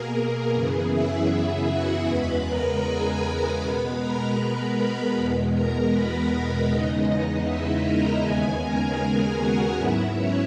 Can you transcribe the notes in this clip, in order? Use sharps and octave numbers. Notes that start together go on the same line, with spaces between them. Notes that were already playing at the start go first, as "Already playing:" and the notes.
Already playing: B2 A#3 G#4 A#4
G#4
F#2 C#3 E3 B3 G#4
E4 E5
F#4 F#5
E2 C#3 G#3 B3 B4 B5
A#4 A#5
G#4 G#5
G#4 G#5
B2 G#3 B3 B4 B5
A#4 A#5
E2 B2 G#3 B3
A#4 A#5
B4 B5
A#4 A#5
E2 C#3 G#3 B3 D#4 D#5
E4 E5
A#4 A#5
D#2 C#3 G#3 B3 G#4 G#5
A#4 A#5
A#4 A#5
F#4 F#5
G#2 F#3 B3 E4 E5
C#4 C#5